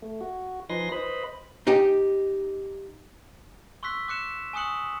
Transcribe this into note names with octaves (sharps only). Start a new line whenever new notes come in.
A3
F#4
F3 D#4 B4 G#5 C6 A#6
B4 C5 D#5 B5
D#4 G4
C6 C#6 E6 F#6 B6
D6 F#6 C#7 E7
G#5 C#6 D#6 F#6 C#7 F#7